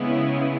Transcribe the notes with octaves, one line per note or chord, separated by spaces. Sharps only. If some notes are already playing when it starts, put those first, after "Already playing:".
Already playing: C#3 G#3 B3 E4